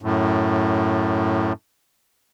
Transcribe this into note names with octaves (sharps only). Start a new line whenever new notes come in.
F#2 A2